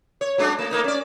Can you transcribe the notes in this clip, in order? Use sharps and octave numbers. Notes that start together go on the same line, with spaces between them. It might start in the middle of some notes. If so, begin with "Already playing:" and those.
C#5
F#3 G#3 D4
A3
A3 A#3 D#4
C#4 D5